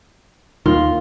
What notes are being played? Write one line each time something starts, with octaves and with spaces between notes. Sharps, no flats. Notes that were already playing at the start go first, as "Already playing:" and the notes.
D#2 D#3 F4